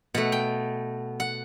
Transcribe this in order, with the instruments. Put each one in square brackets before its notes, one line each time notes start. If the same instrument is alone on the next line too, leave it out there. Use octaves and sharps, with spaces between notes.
[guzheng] B2 A3 F#5
G5
F#5